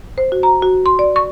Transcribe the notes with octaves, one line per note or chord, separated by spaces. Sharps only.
C5
F#4
A#5
F#4
C6
D5
C#6